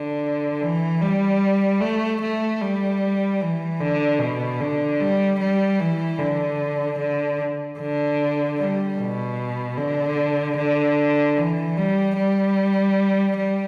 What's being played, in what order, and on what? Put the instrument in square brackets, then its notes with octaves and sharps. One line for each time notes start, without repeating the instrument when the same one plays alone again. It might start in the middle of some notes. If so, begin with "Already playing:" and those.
Already playing: [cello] D3
E3
G3
A3
A3
G3
E3
D3
B2
D3
G3
G3
E3
D3
D3
D3
G3
B2
D3
D3
E3
G3
G3
G3